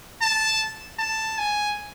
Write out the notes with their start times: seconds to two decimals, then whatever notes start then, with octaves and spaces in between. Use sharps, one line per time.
0.21 A5
0.99 A5
1.38 G#5